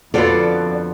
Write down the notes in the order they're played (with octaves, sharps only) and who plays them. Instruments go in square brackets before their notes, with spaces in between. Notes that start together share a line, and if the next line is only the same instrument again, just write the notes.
[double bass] F2 [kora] D3 B3 [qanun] F4 F#4 A4 [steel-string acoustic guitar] D5